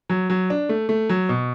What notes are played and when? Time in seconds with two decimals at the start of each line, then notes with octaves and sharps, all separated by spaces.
0.09 F#3
0.30 F#3
0.50 D4
0.69 A3
0.89 A3
1.09 F#3
1.29 B2